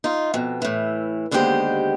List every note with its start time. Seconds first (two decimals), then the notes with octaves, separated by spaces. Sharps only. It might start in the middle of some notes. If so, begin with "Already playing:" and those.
0.04 D#4 F4
0.34 F2 B2
0.62 A2 E3
1.31 D#2 D3 G#3 B3 G4 C5